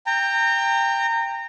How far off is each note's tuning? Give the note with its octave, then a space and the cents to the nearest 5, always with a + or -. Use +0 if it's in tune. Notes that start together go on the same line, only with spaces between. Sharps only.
G5 +15 A#5 -25